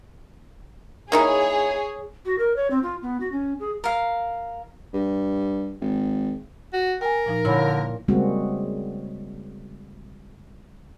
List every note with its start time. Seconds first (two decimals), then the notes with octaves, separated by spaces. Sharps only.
1.12 A#3 D#4 E4 G#4 C#5
2.26 F#4
2.38 A#4
2.56 C#5
2.71 C4
2.83 F4
3.02 B3
3.20 F#4
3.32 C#4
3.60 G#4
3.84 A#4 F5
4.93 G2
5.81 G#1
6.73 F#4
7.01 A#4 G5 G#5
7.26 A#2 F3 D#4
7.45 A#2 D3 E4 C#5 B5
8.08 C#3 G3 G#3 A#3 C4 F#4